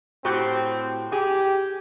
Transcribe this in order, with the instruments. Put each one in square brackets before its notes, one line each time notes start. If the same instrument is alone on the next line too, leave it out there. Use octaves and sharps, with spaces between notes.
[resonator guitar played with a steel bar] A2 F#4 G4 [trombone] C4
[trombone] G4 [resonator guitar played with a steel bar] G#4